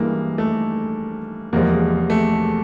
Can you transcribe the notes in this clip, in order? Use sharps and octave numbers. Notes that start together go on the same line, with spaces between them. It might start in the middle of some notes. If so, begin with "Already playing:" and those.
Already playing: G2 E3 G#3 A#3
A3
E2 C3 F3 G#3 A#3
A3